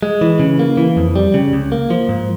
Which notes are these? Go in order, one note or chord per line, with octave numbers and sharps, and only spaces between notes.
G#3
E3
C#3
A#3
E3
F2
G3
C#3
C#2
A#3
F3
G#2